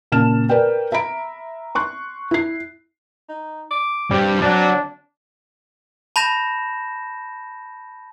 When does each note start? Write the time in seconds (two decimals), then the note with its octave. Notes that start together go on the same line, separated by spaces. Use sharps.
0.12 A#2 C#3 A5 F6 E7
0.49 A#4 B4 D5 G5
0.92 E5 A#5 B5 D7
1.75 C6 C#6 F#6
2.31 E4 C7
3.29 D#4
3.71 D6
4.11 G2 G3 C4 G4
4.42 F#3 D4 D5 F#5
6.16 A5 B5 G6 A#6 E7